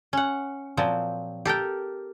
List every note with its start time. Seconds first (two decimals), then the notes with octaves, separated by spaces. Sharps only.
0.13 C#4 F#5
0.77 A#2 F3 F#3 C4
1.45 G4 A4 A#4 G5